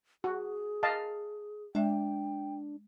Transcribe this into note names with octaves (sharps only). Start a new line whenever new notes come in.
F#4 G#4
D#5 F5 A5
G#3 D4 E5 G5